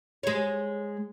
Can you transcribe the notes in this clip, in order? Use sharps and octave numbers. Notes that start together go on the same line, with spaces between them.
G#3 C#5